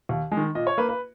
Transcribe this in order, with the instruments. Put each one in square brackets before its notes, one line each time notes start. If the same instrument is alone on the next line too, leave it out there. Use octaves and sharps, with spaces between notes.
[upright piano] D#2
G#3
D#3
A#2 D#5
C#5
A#3 B4
B4